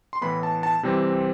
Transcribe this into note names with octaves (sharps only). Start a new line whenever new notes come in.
C6
A2 E3 B3 B5
A5
A5
C3 E3 G3 C4